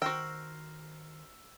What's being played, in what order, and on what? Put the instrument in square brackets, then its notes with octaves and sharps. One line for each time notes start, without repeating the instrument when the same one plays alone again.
[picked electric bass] D#3 [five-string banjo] F#4 G5 [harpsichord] A#4 C5 [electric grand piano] E6